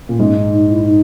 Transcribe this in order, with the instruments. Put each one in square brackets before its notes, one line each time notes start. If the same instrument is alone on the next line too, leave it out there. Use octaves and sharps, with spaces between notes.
[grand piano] A#2
[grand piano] G#2 [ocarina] C#4
[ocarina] D#4
D#4
E4
D#4